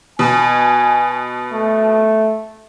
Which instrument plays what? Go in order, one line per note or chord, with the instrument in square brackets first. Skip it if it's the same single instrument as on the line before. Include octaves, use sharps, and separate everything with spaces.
[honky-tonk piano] B2 [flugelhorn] G#5
[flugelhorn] A3